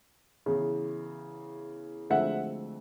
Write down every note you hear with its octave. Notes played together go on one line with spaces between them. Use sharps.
E2 C#3 E3
D2 D3 F3 G#3 C4 E5 F#5